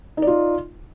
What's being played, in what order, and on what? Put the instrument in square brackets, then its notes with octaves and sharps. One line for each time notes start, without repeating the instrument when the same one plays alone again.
[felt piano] D#4
D5
F4